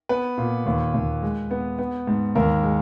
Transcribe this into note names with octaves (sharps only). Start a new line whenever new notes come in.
B3 B4
A#2
D#2
D#2
G#3
B3
B3
G#2
D#2 A#4
G#3